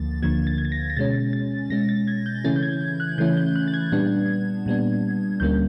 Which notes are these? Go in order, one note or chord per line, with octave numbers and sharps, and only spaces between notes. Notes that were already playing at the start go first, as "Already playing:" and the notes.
Already playing: D2 D3 F3 A#3 A6
D2 D3 F3 A#3 G#6
A6
G#6
A6
A#6
A#6
B2 G#3 C#4 A6
A6
B2 G#3 C#4 A#6
A6
G#6
G6
C#3 E3 A3 C#4 E4 A6
G6
G#6
F#6
C#3 E3 A3 C#4 E4 G6
G6
F#6
A6
G#6
A#2 G3 B3 D4
A#2 G3 B3 D4
D2 D3 G3 A#3 C#4 G6